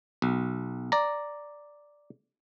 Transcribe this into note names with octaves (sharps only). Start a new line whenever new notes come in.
B1
D5 A#5